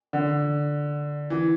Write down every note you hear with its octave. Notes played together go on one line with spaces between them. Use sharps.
D3
E3